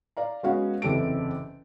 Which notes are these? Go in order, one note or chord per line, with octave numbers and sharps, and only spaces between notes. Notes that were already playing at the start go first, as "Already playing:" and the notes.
D5 F5 A#5
G#3 B3 C#4 F#4 F5 F#5
F#1 E2 C3 G4 A4 D7